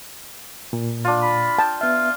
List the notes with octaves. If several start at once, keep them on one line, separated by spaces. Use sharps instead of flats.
A#2
D4 F4
B5
G5 A5
B3 F4 E5